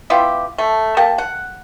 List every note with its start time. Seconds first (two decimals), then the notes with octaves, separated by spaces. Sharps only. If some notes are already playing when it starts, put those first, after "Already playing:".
0.10 B3 E4 F4 G4
0.58 A3
0.97 A#3 G4 A5
1.18 F#5